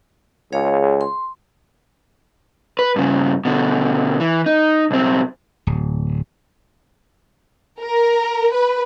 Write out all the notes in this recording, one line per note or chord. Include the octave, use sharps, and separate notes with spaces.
C#2 G#4 C#5 F5
C6
B4
G2 C#3
B2 D3
E3
D#4
B1 C4
D1
A#4
B4